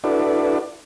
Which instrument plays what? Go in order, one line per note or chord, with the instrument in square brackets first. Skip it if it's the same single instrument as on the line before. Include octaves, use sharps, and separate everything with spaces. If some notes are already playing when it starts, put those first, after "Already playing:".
[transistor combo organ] D4 E4 F#4 A4 B4 D5